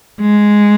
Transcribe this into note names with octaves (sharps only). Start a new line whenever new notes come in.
G#3